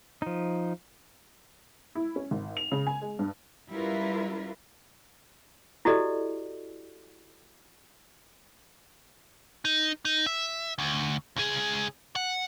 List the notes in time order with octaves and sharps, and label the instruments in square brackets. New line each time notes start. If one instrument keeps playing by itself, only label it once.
[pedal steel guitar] F3 D#4
[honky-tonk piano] E4
C#4
G#1
F7
C#3
G#5
G#3
G2
[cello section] G3 C#4 E4 F4 A#4 B4
[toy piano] E4 F#4 G4 A4 D5 D#5
[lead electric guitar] D#4
D#4
E5
D2
C#2 G#4
F#5